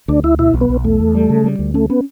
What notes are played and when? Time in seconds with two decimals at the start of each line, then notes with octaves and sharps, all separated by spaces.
0.08 D2 D4
0.23 D2 E4
0.39 B2 E4
0.54 B1
0.61 B3
0.69 B1
0.84 E2 A3
1.00 E2
1.15 G3
1.29 C#3
1.44 G3
1.59 D2
1.74 A3 C#4
1.90 B3 C#4